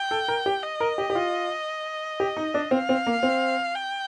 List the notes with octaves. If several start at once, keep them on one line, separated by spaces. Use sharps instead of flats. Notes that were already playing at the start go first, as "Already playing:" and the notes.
Already playing: G5
A4
A#4
G4
D#5
A#4
G4
G4
F4
G4
D#4
D4
C4 F5
C4
A#3
C4
G5